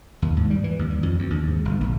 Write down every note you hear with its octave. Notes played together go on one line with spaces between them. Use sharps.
D#2
G#2
G3
E3
D#2
G2
F2
D2
D#2
G#2
G1
A#1